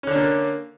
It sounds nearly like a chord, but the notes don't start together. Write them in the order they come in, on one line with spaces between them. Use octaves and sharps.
C#4 D3 D4 A#3